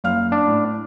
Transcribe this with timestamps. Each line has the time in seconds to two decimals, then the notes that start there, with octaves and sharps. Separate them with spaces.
0.04 F#1 F5 F6
0.32 D4
0.47 A2